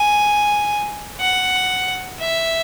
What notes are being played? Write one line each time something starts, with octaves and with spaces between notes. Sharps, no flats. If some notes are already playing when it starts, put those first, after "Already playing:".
Already playing: G#5
F#5
E5